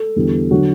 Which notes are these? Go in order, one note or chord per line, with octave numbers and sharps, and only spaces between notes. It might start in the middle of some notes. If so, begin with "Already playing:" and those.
Already playing: A4
E2 D3 G3
D3 F#3 F#4